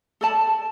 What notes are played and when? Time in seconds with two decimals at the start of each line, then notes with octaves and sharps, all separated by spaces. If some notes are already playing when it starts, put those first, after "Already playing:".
0.21 A4 D5 A5